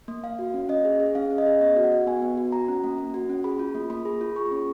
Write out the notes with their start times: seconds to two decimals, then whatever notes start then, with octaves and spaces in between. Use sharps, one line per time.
0.08 A#3
0.24 A#3 F5
0.39 F#4
0.54 C#4
0.69 C#4 D#5
0.85 G#4
1.00 G#4
1.15 C#4 F5
1.31 C#4
1.38 D#5
1.46 G#4
1.61 B3 D#5
1.76 F#4
1.84 F#5
1.92 F#4
2.07 B3 G#5
2.22 B3
2.37 F#4
2.52 F#4 A#5
2.68 C#4
2.84 A#3
2.98 A#3
3.14 F#4
3.29 C#4
3.44 G#4 B5
3.59 F4
3.74 A#3
3.90 A#3 B5
4.05 G#4
4.21 F4
4.36 G#4 C#6
4.51 C#4